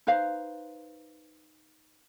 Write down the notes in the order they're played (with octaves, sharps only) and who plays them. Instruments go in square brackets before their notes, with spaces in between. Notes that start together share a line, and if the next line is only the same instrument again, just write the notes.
[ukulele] D#4 B4 C5 F5